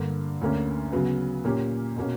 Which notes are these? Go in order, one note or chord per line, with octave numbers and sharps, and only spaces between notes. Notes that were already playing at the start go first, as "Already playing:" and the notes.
Already playing: G2 D3 A#3
D2 D3 A#3 C#4
C#3 F#3 B3
A#2 A#3 C#4 G4
B2 A#3 C#4 F#4